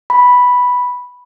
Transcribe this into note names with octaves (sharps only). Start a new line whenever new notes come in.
B5